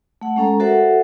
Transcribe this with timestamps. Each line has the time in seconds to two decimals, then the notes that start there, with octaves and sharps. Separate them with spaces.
0.21 A3 F#5
0.36 G#3 C#4 A4 A#5
0.60 F#4 A4 A#4 C5 E5 F#5